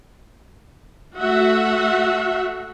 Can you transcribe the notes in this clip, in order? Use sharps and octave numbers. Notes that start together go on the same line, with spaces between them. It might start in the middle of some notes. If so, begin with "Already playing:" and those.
A3 F#4 E5 F#5